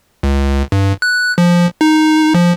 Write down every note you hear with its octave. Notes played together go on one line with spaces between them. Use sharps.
C#2
G2
F#6
F3
D#4
F3